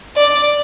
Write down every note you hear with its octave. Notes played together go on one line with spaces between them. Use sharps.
D5